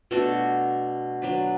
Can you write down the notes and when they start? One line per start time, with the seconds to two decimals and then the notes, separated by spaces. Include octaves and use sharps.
0.11 B2 A3 D4 F#4
1.22 F#3 D4 B4